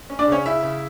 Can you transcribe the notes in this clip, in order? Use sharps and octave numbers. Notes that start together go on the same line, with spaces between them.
C#4
D4 D5
C#3 C#4 C#5
C#3 E4 E5
C#3